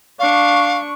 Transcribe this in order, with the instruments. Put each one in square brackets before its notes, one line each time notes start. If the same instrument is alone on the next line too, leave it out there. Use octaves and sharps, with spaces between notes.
[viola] D4 C#6 [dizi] F5